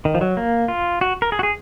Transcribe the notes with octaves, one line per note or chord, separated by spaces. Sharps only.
D#3
F3
F#3
A#3
F4
F#4
A#4
G#4
F#4
G#4